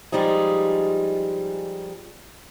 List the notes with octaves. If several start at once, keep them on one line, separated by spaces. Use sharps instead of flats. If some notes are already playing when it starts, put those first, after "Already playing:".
F3 G3 G#3 D#4 G#4